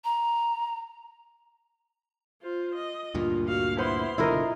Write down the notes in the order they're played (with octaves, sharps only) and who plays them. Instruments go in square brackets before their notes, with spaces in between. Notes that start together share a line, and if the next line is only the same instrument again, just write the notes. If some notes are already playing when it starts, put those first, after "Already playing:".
[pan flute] A#5
[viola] F4 C5
D#5
[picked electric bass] D2 G2 A#2 [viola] F4
[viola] F#4 F5
[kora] B3 C5 [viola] E4 C6
[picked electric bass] F#1 B2 D3 [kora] E4 A#4 D#5 [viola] F4